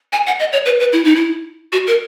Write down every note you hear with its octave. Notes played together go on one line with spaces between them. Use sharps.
G#5
F#5
D#5
C#5
B4
B4
E4
D#4
E4
F#4
A#4